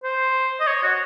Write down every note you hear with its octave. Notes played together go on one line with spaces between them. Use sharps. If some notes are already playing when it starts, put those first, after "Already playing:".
C5
D#5
C#5
F#4